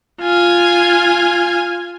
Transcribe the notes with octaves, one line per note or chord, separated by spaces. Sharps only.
F4 G#5